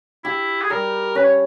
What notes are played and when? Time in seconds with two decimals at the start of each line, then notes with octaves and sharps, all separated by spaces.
0.24 E4 G4
0.61 G#4
0.70 G3 A#4
1.15 C#4 B4
1.23 C#5